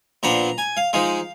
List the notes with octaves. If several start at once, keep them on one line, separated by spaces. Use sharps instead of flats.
A#2 F3 B3 D4 A#5
G#5
F5
F3 G#3 D#4 F5